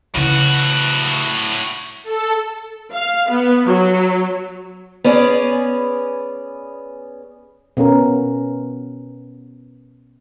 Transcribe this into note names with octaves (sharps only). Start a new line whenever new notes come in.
A2 C#3 E3 F#4
A4
F5
B3
F#3
B3 C#4 G#4 D5
B2 B3 C#4 A#4